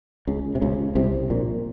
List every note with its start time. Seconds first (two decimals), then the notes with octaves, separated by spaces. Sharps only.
0.27 C#2 C#3
0.55 C3
0.62 C#2 C#3
0.95 C2 C3
1.30 A#1 A#2